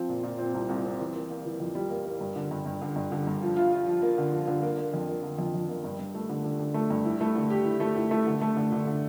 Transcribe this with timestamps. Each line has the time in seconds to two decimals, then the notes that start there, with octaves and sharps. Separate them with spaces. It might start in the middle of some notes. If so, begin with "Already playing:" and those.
Already playing: F3 C4
0.09 A#2
0.23 A#2
0.39 C4
0.54 C2
0.69 C2
0.85 C4
1.00 E3
1.14 A#3
1.30 A#3
1.45 E3
1.60 F2
1.75 G3
1.90 A#3
2.05 A#3
2.21 G2
2.36 D3
2.51 G2
2.66 G2
2.82 D3
2.96 G2
3.12 D3
3.27 G2
3.42 F3
3.56 F4
3.73 F4
3.87 F3
4.02 A#3
4.18 D3
4.32 F3
4.48 D3
4.62 A#3
4.78 A#3
4.94 F2
5.08 A#3
5.23 D3
5.38 F2
5.54 F2
5.69 A#3
5.84 G2
5.99 G2
6.14 A3
6.29 D3
6.44 D3
6.59 D3
6.74 A3
6.90 G2
7.05 E4
7.21 A3
7.36 D3
7.51 G4
7.65 E4
7.80 A3
7.96 E4
8.11 A3
8.27 D3
8.41 A3
8.57 D3
8.72 D3
8.87 D3